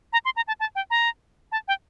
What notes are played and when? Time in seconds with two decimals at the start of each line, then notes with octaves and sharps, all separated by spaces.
0.13 A#5
0.25 C6
0.36 A#5
0.48 A5
0.60 A5
0.75 G5
0.90 A#5
1.52 A5
1.68 G5